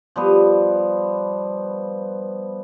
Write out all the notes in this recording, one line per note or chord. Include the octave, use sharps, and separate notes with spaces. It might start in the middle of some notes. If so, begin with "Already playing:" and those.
F3 G3 B3